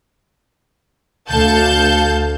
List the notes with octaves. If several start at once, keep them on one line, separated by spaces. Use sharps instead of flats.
D2 A4 F5 A5 G6